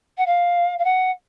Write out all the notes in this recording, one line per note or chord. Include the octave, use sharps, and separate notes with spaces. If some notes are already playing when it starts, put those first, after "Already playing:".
F#5
F5
F5
F#5